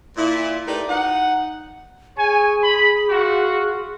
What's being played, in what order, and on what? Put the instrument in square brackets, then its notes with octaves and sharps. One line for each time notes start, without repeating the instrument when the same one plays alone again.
[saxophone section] A#2 E4
A3 D#4 G4 A#4 B4 D5
D#4 F#5
[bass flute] G#4 [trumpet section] C#5 G#5
[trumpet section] B5
F4 F#4